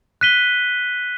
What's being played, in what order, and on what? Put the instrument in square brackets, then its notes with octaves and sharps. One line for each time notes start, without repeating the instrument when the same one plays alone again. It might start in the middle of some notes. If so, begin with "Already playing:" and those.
[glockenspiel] F#6 B6 D#7 G7